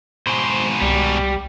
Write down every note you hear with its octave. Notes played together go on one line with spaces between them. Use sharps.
G#2 B2 C5
C2 G3